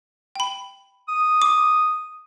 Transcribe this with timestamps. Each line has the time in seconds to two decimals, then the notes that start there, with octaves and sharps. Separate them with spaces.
0.36 G5 B5
1.09 D#6
1.42 D6